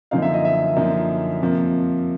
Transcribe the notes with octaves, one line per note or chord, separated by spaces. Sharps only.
F#2 D3 F3 A#3 D#4 F5
E5
D#5
E5
F#2 D3 F3 A#3 D#4
F2 C3 F3 A#3